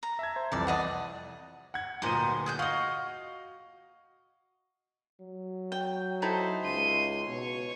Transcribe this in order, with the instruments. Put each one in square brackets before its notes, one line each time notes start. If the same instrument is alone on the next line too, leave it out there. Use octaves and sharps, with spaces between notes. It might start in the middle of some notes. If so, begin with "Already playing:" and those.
[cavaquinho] A#5
[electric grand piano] E5 A5 G#6
C5
[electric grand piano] C2 F2 E3 [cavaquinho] D5 A5
[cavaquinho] D5 D#5 F#5
[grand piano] F#5 G#6
[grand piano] D1 A#2 D#7 [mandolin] B3 D#4 C5
[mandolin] G#4 F#6 G6
[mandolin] F#4 D#5 [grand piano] F5
[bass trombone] F#3
[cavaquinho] G5
[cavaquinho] D#4 E4 A4 [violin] C5
[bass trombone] C#2 [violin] C6 D#7
[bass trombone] B2 [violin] C#5 C#6